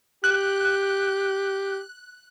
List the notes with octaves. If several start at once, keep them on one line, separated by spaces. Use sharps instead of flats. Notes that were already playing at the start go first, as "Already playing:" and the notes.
G4 F#6